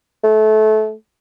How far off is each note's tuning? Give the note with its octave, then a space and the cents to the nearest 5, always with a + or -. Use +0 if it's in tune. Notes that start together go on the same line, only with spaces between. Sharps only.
A3 -25